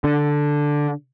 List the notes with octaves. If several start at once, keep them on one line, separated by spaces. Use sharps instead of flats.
D3